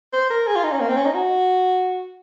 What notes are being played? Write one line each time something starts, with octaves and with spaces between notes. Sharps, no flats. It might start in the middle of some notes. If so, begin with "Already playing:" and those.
C5
A#4
G#4
F4
D#4
C#4
A#3
C4
C#4
D#4
F#4